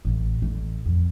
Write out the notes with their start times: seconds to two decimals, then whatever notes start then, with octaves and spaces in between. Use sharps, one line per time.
0.05 A1
0.42 A1
0.86 F2